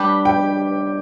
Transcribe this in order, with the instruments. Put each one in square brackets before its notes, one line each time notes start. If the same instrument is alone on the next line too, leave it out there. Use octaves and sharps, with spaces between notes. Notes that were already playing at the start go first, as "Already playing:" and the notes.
Already playing: [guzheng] G3 D4 G4 B4
[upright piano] G5